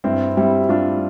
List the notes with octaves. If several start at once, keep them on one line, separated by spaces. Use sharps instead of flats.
G2 C4 E4
G3 C4 E4
G3 D4 F4